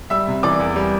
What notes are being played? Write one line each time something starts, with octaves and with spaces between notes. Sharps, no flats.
G3 E5 E6
C3
E3 D5 D6
E2
G3